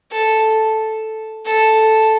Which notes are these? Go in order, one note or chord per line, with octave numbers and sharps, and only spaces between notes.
A4
A4